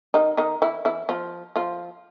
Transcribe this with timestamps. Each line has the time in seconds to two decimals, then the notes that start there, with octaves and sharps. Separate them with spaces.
0.14 D#3 D#4
0.37 D#3 D#4
0.62 E3 E4
0.85 E3 E4
1.09 F3 F4
1.56 F3 F4